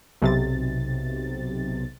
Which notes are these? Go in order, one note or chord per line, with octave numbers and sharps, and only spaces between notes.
B1 C3 A6